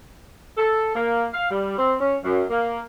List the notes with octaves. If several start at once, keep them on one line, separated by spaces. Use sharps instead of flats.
A4
A#3
F5
G3
C4
C#4
F#2
A#3